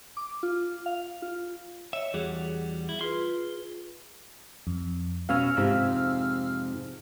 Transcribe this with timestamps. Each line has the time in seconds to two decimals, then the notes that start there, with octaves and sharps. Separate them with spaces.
0.17 D6
0.43 F4
0.86 F5
1.22 F4
1.93 C#5 D#5 E5
2.14 E2 G3 F#4 G#4
2.89 E4
3.01 F4 G#4 B4 C6
4.67 F2
5.29 B2 C#4 F5 E6 F6
5.57 F2 G#2 C3